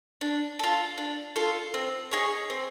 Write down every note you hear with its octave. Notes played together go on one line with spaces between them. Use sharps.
D4
F4 A4
D4
F4 A4
C4
D#4 G#4 C#5
C4